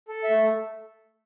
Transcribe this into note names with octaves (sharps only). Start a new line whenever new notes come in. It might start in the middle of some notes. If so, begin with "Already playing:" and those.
A4
E5
A3